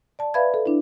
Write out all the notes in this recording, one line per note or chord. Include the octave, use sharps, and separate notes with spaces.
D5 A5
B4 D5 E5 F5 B5 G#6
A4
D4 E4